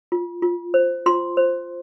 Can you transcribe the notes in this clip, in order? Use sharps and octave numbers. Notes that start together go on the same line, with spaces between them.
F4
F4
C5
F4 C6
C5